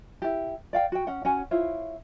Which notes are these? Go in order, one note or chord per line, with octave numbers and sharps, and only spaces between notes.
E4 G4
D5 F5 G5
F#4 G5
C#4 F#5
C#4 F#4 F#5 G#5
E4 F4 C5 C#5